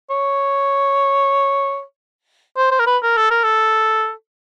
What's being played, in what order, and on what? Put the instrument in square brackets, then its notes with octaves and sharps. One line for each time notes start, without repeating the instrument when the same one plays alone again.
[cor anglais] C#5
C5
C5
A#4
B4
A#4
A4
A#4
A4